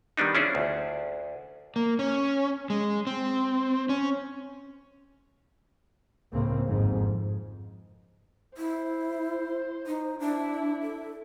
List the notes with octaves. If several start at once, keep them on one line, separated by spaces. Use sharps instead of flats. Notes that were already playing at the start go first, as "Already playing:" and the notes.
D#3 G3 B3 D4 D#4
C#4 D4 E4 F4 G#4 C5
D2
A#3
C#4
G#3
C4
C#4
C#2 A2 C#3 A#3 C4
G#1 F2 G#2
E4 C5
D#4 C5
D4 E4
A4